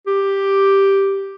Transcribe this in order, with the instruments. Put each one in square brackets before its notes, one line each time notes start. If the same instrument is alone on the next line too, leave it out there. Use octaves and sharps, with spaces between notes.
[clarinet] G4